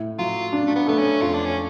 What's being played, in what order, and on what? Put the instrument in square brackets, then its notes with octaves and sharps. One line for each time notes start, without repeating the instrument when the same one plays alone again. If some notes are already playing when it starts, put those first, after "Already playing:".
Already playing: [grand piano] A2
[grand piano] F#3 [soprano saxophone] F4
[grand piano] D4
[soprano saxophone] A3
B3
[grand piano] A3 [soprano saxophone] B3
[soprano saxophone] C#4
[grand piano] F2 [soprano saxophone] F4
[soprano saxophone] D4
C#4